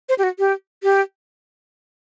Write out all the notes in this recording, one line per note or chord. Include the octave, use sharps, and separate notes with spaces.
C5
G4
F#4
G4
G4